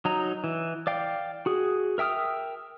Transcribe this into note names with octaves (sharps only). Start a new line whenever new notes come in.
F#3 D#4 A#5
E3
D5 F5 G5
F#4 G#4
A#4 E5 G5 D#6 F6